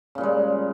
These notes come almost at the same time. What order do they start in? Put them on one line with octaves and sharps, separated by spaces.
C#3 A#2 G3 G#3